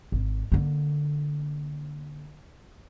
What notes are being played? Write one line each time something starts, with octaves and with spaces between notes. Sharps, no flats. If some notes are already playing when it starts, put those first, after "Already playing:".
G#1
D3 A#3